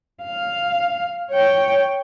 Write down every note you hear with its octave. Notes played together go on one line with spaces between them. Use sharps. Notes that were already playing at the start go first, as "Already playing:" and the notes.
F5
C#5 G5